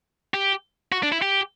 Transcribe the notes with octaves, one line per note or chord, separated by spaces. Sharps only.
G4
F#4
D4
E4
G4